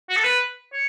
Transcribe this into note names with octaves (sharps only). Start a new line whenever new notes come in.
F#4
A4
B4
C#5